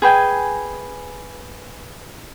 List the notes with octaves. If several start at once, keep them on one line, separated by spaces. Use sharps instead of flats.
G#4 B4 G5 G#5